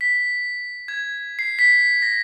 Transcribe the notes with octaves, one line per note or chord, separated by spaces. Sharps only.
B6
G#6
C7
B6
A#6